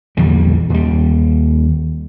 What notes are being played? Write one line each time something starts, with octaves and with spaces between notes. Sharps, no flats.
A#1 E2 D3 G3
D#2 G3